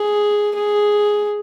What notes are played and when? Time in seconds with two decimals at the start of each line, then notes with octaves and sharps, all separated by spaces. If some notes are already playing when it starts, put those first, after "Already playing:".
Already playing: G#4
0.56 G#4